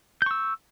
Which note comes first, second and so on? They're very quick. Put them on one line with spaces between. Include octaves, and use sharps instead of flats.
G6 C#6 E6